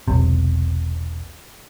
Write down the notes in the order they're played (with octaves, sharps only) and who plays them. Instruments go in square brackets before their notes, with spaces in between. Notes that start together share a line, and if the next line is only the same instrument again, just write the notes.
[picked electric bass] E1 B1 C3